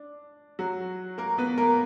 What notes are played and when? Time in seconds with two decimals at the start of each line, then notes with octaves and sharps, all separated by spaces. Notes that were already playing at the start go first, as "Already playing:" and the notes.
Already playing: D4
0.59 F#3 F#4
1.18 A#3 A#4
1.38 B3 B4
1.58 A#3 A#4